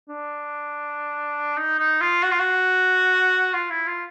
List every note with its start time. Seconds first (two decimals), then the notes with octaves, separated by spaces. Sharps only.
0.09 D4
1.58 D#4
1.79 D#4
2.01 F4
2.23 F#4
2.32 F4
2.40 F#4
3.54 F4
3.70 E4
3.87 F4